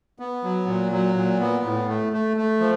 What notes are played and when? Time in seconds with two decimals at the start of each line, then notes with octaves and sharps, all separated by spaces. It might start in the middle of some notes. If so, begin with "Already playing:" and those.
0.19 B3
0.44 F#3
0.67 A#2
0.92 F#3
1.16 A#2
1.40 B3
1.65 A2
1.89 A3
2.13 A3
2.37 A3
2.60 F3